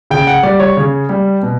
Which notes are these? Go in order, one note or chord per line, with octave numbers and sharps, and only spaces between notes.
C#3 G5
F#5
G3 D5
C#5
C#3
G3
B2